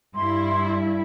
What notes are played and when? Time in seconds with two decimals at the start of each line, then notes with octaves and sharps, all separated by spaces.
0.15 G2 E4 C6